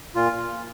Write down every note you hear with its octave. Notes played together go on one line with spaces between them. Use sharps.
A#2 F4
A#2